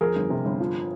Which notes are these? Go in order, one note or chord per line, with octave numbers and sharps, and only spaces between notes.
F2 G#4 A#4
G1
C3
G1
F3